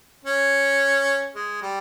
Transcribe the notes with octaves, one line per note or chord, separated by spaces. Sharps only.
C#4
G#3
G3